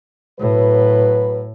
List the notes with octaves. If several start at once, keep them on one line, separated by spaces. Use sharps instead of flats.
A2 F#3 B4